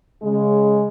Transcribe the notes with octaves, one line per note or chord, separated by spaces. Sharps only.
C#3 G#3